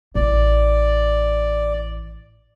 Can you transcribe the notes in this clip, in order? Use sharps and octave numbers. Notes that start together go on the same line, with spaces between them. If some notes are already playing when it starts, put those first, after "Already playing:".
A1 D5